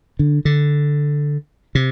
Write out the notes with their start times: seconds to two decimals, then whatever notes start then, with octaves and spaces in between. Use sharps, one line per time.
0.19 D3
0.45 D3
1.75 C3